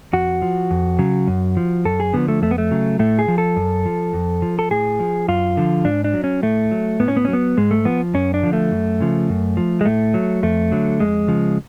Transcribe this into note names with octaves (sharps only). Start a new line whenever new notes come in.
F2 F#4
F3
F2
C#3 F#3
F#2
F3
F#2 A4
G#4
D3 F3 B3
A3
F2 A3
B3
A3
C#3 F#3
A2 A3
G#4
F3
A4
F#2
F3
F2
F3
A4
A2 G#4
F3
F#2 F4
D3 F3
G#2 D4
D4
F#3
C#4
A2 A3
F#3
A2 B3
C#4
B3
F#3 C#4
B3
G#2 G#3
A3
F3 B3
F#2 C#4
D4
D3 F3
A3
F#2
C#3 F3
F#2
F3
G#3
A2 A3
F#3
F2 A3
D3 F#3
F2 G#3
C#3 F3